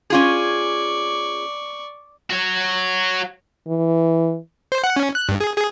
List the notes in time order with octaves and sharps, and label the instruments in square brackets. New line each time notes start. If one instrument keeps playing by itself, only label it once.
[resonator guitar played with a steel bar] C#4 F4 G#4 [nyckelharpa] D5 C#6
[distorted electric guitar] F#4 C#5
[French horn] E3
[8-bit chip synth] C5
F#5
C#4
F#6
G2
G#4
G#4